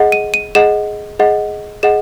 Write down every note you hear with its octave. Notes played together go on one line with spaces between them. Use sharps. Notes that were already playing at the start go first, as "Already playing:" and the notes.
Already playing: G#4 D#5 F#5
D#7
D#7
G#4 D#5 F#5 E7
G#4 D#5 F#5
G#4 D#5 F#5 E7